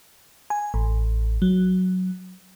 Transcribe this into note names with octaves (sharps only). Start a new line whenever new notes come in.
G#5
A1
F#3